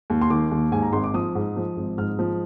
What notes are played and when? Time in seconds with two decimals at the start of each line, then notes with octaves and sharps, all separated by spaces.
0.10 D#2
0.21 C6
0.30 D#3 D6
0.51 D#2
0.72 G#2 G#5
0.82 A#5
0.93 G#1 C6
1.04 D6
1.14 F3 D#6
1.35 G#2
1.56 F3
1.77 G#1
1.98 G#2 F6
2.19 F3